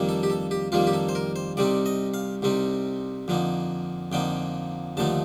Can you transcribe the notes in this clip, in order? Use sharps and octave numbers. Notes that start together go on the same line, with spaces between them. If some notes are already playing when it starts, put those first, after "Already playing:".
Already playing: F2 D#3 G3 A#3
A4
G4
A4
G4
F2 D#3 G3 A#3 F4
G4
A4
C5
A#4
C5
C2 C3 G3 C4 D#4 D5
D#5
F5
C2 C3 G3 C4 D#4
F2 D3 F3 A#3 D#4
F2 D3 F3 A#3 D#4 G5
D#2 D3 F3 A3 D#4 A5